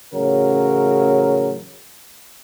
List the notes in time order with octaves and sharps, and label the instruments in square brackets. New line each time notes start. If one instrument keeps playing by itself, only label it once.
[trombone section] A1 C#3 F#3 A#4